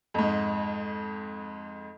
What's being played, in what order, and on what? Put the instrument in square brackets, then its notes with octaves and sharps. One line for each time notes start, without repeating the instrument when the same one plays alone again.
[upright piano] F2 G#2